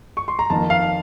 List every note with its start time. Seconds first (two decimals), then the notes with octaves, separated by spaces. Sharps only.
0.17 C#6
0.28 C6
0.39 A#5
0.50 F2 D#3 A#3 A5
0.70 F5